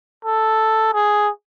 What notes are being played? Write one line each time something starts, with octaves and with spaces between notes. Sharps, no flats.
A4
G#4